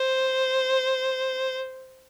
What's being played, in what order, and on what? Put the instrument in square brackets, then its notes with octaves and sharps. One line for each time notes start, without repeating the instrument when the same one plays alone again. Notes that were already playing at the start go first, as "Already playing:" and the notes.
Already playing: [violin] C5